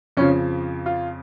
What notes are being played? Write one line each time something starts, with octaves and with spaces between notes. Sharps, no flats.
F2 C#3 F3 C#4
F4